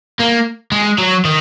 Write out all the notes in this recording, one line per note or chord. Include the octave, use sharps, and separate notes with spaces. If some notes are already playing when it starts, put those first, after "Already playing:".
A#3
G#3
F#3
D#3